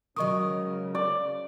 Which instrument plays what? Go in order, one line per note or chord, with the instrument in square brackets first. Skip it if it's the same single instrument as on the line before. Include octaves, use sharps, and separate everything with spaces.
[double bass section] C#3 [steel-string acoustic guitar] F#3 G#3 A#4 [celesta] D#5 C#6 D#6
[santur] D5